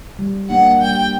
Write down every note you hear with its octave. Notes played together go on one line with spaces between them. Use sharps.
G3
A#3 D4 F#5
G3 G5